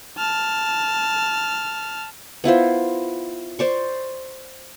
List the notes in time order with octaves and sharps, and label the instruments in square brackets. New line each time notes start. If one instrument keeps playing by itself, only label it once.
[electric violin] A5 F6
[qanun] B3 E4 F4 C5
C5 D5 C#6